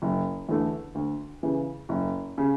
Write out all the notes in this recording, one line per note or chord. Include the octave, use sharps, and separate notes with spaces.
F#1
E2 D3 A3
D2
C#3 E3
F#1
C#3